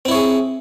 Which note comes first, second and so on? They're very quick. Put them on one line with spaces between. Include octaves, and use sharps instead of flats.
C4 E4 C#5 G#4